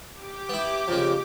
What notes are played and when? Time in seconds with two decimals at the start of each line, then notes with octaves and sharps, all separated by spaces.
0.13 G4 D6
0.49 B3 E4
0.88 F2 C#3 A#3